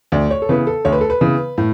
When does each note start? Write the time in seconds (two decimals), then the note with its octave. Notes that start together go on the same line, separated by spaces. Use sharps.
0.12 D2 D5
0.31 C#5
0.42 A4
0.49 C#3 E3 B3 B4
0.67 A4
0.85 D2 C#5
0.92 B4
1.01 A4
1.10 B4
1.21 C#3 E3 B3
1.58 A2